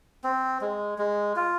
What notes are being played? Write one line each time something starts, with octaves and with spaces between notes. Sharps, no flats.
C4
G#3
G#3
F4